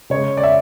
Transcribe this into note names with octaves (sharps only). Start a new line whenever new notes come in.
C#3 G#3 C#5
D5
E5